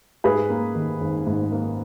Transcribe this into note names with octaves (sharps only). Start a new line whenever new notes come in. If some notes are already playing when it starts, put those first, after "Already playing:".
G#2 G#4 B4
A#3
D#3
G#1
G#2
A#3